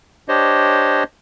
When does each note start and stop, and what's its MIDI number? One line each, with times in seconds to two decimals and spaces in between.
0.29 1.04 62
0.29 1.04 67
0.29 1.04 72
0.29 1.04 73
0.29 1.04 75